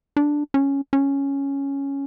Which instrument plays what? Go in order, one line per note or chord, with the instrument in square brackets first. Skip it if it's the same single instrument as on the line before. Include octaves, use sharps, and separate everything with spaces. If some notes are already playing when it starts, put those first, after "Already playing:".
[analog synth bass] D4
C#4
C#4